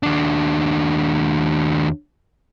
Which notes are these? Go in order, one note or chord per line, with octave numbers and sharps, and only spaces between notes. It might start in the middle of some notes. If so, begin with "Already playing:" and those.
D#2 D4